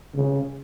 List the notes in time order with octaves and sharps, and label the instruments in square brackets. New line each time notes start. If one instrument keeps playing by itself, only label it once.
[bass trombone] C#3